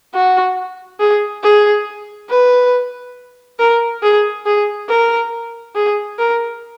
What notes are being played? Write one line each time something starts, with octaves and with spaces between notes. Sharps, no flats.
F#4
G#4
G#4
B4
A#4
G#4
G#4
A#4
G#4
A#4